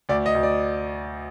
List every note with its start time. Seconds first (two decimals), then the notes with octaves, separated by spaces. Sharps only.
0.09 D2 D5
0.26 D#5
0.35 D2
0.43 D5